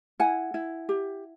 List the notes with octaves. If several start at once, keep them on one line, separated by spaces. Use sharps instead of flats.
E4 F#5 G#5
E4
G4